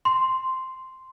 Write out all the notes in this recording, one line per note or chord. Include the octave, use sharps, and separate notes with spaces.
C6